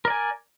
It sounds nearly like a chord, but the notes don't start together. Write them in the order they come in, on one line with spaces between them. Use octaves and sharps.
A#4 D5 G#5